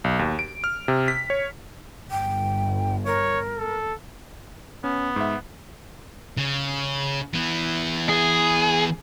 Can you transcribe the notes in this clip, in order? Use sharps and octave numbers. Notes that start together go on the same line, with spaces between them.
B1
D#2
D7
F6
C3
B6
C#5
G1 G5
A#4 C#5
A4
B3 C#4
G#2 E5
C#3
E3 B3
G#4